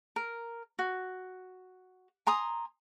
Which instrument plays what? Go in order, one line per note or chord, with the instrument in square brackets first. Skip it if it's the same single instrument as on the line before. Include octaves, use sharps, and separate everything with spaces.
[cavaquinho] A#4
F#4
G#5 A#5 C6 D#6